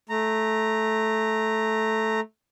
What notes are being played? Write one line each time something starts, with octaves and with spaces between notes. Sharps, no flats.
A3 A#5